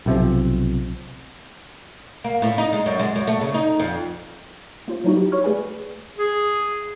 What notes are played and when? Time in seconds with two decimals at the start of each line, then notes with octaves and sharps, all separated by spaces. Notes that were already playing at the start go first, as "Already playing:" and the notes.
0.06 B1 C3 F3
2.24 A#3
2.42 A2
2.58 D#4
2.73 G#3
2.86 F#2
2.99 G#3
3.16 F#2
3.27 A3
3.41 C#3
3.54 D#4
3.80 F2
4.88 A#3 F4 C5
5.04 F#3 G3 D#4 E4 F#4
5.17 G4
5.32 C#5 B5 C#6 F6 G#6
5.44 A3 G#4 B4 D5 G#5
6.18 G#4